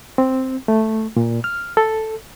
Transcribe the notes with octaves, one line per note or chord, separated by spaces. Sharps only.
C4
A3
A#2
F6
A4